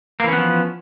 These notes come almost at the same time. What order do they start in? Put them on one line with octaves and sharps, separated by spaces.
A#3 E3 C#4 B3 F3